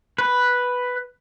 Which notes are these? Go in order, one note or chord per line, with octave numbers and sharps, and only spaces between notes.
B4